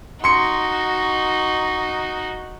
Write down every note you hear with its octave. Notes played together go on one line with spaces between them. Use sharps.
D#4 F#4 C6 C#7